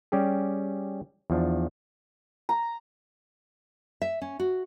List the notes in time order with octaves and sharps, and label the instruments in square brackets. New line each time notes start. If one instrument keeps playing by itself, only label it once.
[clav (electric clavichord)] G3 C#4 G4 G#4
E2 F3 D4
[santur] A#5
[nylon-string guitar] E5
C#4
F#4